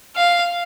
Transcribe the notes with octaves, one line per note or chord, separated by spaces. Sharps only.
F5